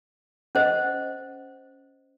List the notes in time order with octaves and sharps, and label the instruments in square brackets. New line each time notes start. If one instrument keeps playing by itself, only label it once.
[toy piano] C#4 C5 D#5